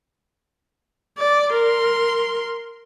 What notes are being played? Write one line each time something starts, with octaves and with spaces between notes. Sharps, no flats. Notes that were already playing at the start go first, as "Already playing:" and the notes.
D5
A#4 C6